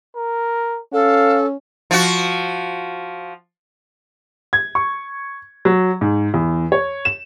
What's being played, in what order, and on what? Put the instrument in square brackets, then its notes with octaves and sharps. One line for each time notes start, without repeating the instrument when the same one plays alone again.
[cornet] A#4
[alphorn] C#4 [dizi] A4 [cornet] F5
[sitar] F3 F#4
[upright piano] G#6
C#6
F#3
G#2
E2
C#5
E7